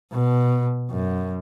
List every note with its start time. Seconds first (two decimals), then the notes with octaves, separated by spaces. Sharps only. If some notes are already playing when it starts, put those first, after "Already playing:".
0.13 B2
0.91 F#2